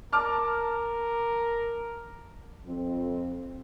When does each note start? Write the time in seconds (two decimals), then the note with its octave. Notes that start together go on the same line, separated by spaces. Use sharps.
0.13 A#4 A5 D6 F6
2.66 F2 C4